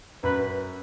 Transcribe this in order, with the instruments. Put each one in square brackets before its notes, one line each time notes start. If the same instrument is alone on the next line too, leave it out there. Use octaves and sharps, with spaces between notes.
[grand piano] F#2 [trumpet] B4